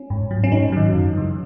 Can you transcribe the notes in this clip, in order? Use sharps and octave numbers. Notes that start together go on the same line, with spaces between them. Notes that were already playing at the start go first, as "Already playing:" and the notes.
Already playing: C#4
G#2
F#3
C#4
G#2 D#4
D#3 F#3
F#2
C#3 E3